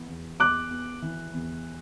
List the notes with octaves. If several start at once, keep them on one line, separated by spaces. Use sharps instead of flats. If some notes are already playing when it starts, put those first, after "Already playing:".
Already playing: E3 B3
E2
E2 D6 F#6
B3
E3
E2